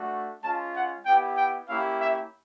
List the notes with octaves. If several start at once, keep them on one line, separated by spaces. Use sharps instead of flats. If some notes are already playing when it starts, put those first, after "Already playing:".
Already playing: A3 D4 F#4
G#3 C#4 F4 A5
F#5
B3 E4 G4 G5
G5
A#3 C#4 E4 G4 F5
E5